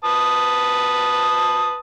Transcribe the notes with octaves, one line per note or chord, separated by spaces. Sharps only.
B4 A5 D#6